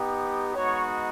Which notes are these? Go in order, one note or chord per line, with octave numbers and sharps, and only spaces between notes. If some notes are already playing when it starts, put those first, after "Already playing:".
Already playing: B3 D#4 G4
G#3 B3 D#4 F#4 C#5